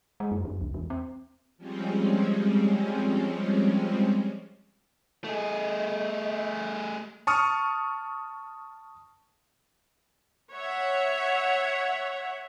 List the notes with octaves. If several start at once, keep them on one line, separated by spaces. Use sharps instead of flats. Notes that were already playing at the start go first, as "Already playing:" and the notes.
G#3
F#2
F2
C2
E2
C4
F3 G3 G#3 C4 C#4
A3 G#4 D#5
A5 C#6 D#6 F6
C#5 E5 F#5